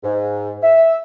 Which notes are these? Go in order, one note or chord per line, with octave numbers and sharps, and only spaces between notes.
G#2
E5